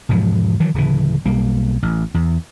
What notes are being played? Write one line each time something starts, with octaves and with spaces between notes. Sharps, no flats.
E1 G#2 F3 F#3
D#3 E3 F#3
D1 C#3 E3
B1 G3 A#3
A1
E2